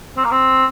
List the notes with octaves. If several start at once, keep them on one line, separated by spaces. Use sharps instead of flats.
C4
A#3
C4